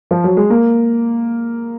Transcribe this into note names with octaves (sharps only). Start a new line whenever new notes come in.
F3
F#3
G#3
A#3